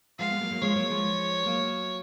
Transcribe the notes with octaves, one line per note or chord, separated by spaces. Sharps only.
F3 G#3 F5
G#3 B3
F#3 A#3
F#3 A#3
F3 G#3 C#5
F#3 A#3
F3 G#3
F#3 A#3